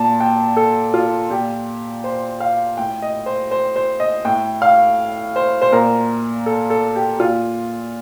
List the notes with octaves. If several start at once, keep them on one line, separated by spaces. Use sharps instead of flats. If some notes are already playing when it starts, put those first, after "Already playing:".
Already playing: A#2 A5
G5
A4
F4
A#2 G4
C5
F5
A2 G5
D#5
C5
C5
C5
D#5
A2 G5
F5
C5
C5
A#2 A#4
A4
A4
G4
A#2 F4